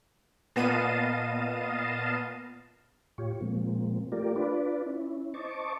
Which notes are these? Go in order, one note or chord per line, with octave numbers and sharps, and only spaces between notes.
A#2 B3 D#5 F5 A5 D#7
A2 F4 G4 C#5
A#2 F3 G#3 A#3 C4
A3 F4 G4 A#4 D5
D4 F4 B4 D5
C#4 E4
C5 D#5 A5 C#6 D6